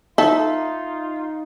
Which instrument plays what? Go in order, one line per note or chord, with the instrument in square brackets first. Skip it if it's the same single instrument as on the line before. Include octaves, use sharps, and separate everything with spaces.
[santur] D#4 D#5 [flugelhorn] F4 [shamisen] A4 [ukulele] E5